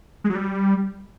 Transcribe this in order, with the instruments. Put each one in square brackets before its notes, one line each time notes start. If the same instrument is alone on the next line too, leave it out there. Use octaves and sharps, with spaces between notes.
[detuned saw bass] G#3
F#3
G3